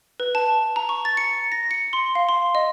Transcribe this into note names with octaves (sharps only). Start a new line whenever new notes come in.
B4
A5
A#5
C#6
A6
C#7
A#6
C#7
C6
F5
C6
D#5